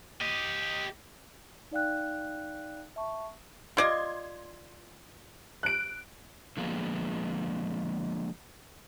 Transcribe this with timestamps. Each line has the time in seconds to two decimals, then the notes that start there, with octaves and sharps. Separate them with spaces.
0.22 G4 D#5
1.71 D#4 D5 F5 G5 F#6
2.96 E5 A5 C#6
3.77 F4 D5 D#5 C6 G#6
5.63 F#6 D7
6.57 D3 F3 G#3 A#3 B3